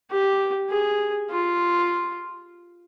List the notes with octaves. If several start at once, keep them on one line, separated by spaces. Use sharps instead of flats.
G4
G#4
F4